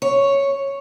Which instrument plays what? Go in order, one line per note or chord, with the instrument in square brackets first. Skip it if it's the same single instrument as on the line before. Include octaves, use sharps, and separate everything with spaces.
[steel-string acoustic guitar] C#5